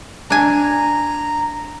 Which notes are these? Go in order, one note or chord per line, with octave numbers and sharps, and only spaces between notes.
D4 G#5 A#5